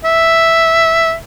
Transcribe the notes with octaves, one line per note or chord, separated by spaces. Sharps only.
E5